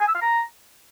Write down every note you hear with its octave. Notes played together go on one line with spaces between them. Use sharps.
G#5
E6
F5
A#5